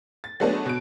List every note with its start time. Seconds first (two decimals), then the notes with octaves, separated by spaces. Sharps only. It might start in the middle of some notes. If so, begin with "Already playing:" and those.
0.24 A6
0.40 F#3 G#3 A3 B3 D4
0.66 B2 D7